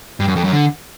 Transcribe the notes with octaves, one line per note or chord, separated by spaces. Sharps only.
G2
F#2
F2
F#2
D3